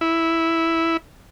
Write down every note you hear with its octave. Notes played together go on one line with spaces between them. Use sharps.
E4